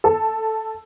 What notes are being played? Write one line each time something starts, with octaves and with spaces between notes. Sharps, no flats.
A4